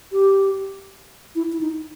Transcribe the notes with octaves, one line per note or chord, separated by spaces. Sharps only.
G4
E4
E4
D#4